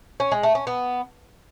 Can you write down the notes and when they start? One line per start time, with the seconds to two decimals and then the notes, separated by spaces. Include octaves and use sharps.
0.20 C#4
0.32 G#3
0.43 A3
0.55 C#4
0.67 B3